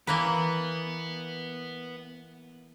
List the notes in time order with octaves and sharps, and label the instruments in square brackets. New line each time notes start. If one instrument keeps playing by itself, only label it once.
[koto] E3 A#3 B4 [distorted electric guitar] B3